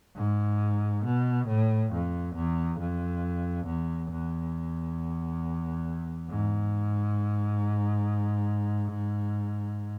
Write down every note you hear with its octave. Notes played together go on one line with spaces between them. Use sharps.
G#2
B2
A2
F2
E2
F2
E2
E2
G#2